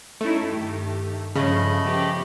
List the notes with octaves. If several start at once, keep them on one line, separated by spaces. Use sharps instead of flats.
A3 C#4 D#4 E4
G2 D#3 G4
G2 C#3 F3 A3 D#5 B5
F3 B3 G4